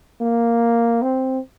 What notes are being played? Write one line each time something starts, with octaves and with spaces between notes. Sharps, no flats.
A#3
C4